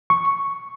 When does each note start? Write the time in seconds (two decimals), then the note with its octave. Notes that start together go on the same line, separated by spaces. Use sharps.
0.10 C#6